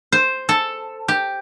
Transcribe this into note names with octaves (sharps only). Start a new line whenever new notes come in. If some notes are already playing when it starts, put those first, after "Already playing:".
C5
A4
G4